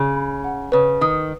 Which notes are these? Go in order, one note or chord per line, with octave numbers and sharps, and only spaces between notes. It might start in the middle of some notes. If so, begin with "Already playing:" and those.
Already playing: C#3 G#4
B5
F#5
C#3 B4
D#3 D#6